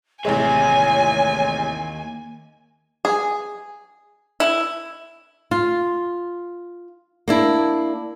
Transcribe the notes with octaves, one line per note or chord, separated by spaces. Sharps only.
A1 D#2 C3 G#3 C#5 E5 G#5
G#4
E4
F4
A#3 D4 E4